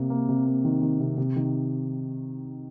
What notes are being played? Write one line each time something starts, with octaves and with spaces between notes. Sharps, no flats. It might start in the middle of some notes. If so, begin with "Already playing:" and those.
Already playing: C3 A#3
A#3
C3
A#3
D#3
D#3
C3
C3
D#3